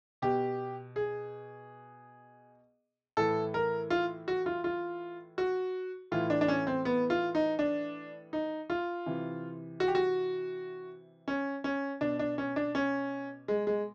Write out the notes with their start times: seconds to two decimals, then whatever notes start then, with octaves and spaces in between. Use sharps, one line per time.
0.22 B2 G4
0.96 G#4
3.17 A2 E3 A4
3.54 A#4
3.90 F4
4.28 F#4
4.46 F4
4.64 F4
5.38 F#4
6.12 A2 E3 F4
6.30 D4
6.41 D4
6.48 C#4
6.67 C4
6.85 B3
7.10 F4
7.35 D#4
7.59 D4
8.33 D#4
8.70 F4
9.06 C3 E3
9.80 F#4
9.88 G4
9.95 F#4
11.28 C#4
11.64 C#4
12.01 B2 D4
12.19 D4
12.38 C#4
12.56 D4
12.75 C#4
13.48 G#3
13.67 G#3